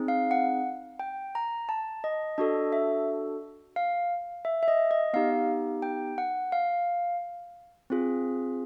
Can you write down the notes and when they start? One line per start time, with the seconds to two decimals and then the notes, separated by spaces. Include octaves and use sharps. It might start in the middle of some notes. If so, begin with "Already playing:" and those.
Already playing: C4 D#4 G#4
0.08 F5
0.31 F#5
0.99 G5
1.35 A#5
1.69 A5
2.04 D#5
2.38 D4 F#4 A4 D#5
2.72 E5
3.76 F5
4.45 E5
4.63 E5
4.68 D#5
4.91 D#5
5.13 B3 D#4 G4 F5
5.82 G5
6.18 F#5
6.52 F5
7.90 C4 F4 G#4